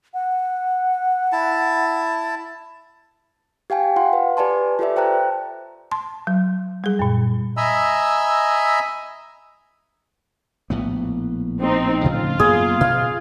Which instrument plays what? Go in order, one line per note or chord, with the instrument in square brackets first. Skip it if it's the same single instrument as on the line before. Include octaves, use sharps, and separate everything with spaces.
[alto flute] F#5
[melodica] E4 A5
[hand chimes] G4 F5 G5 G#5
F4 F5 F#5 C6
B4
G4 B4 D5 G#5 A5 C6
F4 G4 A4 B4 D5 E5
C5 G5 A5 A#5 F#6
[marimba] A5 C6
F#3
G3 G#4
F#2 A#2
[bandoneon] D#5 E5 G#5 A#5 B5 E6
[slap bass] A#1 A2 B3
[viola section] C4 D#4
[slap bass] A2 C#3 F3 [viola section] F4
[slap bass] F#2 A#3 B3 [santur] G#4
[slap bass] B2 [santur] F5